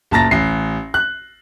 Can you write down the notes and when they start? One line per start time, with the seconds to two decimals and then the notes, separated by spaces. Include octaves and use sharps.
0.11 F#1 A#2 A5 A#5 A6 A#6
0.31 A1 C7
0.94 F#6